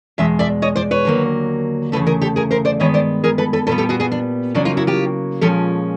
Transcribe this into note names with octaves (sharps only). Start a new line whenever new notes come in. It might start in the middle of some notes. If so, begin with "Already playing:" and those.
E2 B2 G#3 E5
D5 E5
C#5 D#5
C5 D5
B4 C#5
D#2 D3 F#3 A#3
E2 C#3 F3 A3 A4 B4
G#4 A#4
G4 A4
G#4 A#4
A#4 C5
C5 D5
G2 D#3 G#3 B3 C#5 D#5
C5 D5
G#4 A#4
A4 B4
A4 B4
A#2 G3 B3 A4 B4
G4 A4
F#4 G#4
F#4 G#4
D4
C#3 F#3 A#3 D4
D#4 F4
E4 F#4
F4 G4
A#2 F3 G#3 C#4 G4 A4